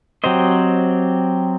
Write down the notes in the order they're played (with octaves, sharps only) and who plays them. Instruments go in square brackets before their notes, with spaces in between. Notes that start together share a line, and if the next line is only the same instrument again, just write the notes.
[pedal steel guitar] F#3 C4 G4 C5 D#5